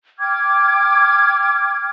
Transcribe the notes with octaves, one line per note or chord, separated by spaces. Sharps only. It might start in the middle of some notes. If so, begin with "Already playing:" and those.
G5 D6 F6 G#6